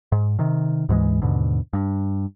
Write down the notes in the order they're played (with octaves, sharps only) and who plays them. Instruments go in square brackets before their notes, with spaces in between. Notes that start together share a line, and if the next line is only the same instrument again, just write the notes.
[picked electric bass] G#2
C3 D#3
D2 G#2 E3 G#3
D#2 G#2 B2 D3
G2